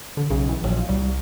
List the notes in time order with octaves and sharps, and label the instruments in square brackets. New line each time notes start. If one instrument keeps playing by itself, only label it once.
[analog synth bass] D3
[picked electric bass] B1 [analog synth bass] C#3
[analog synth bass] E3
[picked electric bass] A#1 [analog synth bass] F#3
[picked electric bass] C2 [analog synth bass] G3